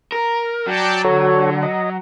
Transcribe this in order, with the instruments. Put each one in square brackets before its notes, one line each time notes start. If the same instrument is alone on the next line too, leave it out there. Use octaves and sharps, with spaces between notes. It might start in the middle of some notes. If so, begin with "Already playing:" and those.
[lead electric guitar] A#4
[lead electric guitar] F#3 [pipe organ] D5 G5 A5
[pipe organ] D3 [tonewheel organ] F#4 A4 C#5
[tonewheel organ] D#5